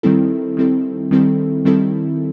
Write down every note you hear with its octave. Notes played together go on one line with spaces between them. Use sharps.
D#3 G3 C4 E4 A4
D#3 G3 C4 E4 A4
D#3 G3 C4 E4 A4
D#3 G3 C4 E4 A4